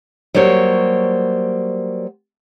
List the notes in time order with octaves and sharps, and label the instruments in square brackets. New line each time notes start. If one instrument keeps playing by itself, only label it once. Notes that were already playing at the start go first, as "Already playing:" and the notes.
[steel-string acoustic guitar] F#3 G3 A#3 C5 C#5